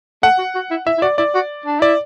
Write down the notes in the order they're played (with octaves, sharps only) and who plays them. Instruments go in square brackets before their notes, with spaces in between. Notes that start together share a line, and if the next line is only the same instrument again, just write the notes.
[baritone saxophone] A3 [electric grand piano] F#5
[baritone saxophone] F#4
F#4
E4
[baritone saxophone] E4 [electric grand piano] E5
[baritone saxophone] E4
[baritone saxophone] F#4 [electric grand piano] D5
[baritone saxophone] E4 [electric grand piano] D5
[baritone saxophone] F#4
D4
[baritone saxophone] E4 [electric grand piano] D5